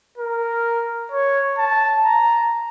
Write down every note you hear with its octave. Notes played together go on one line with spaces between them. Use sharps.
A#4
C#5
A5
A#5